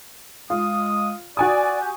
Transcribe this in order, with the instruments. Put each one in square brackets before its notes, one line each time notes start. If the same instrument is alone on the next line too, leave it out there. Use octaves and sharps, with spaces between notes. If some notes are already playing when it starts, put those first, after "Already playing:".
[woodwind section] G#3 D#6 [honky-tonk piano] F4
[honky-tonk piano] F#4 G#5 D#6 [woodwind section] D5
[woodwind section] G4